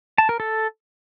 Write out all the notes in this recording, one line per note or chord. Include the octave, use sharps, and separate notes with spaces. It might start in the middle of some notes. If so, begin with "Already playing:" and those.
A5
A#4
A4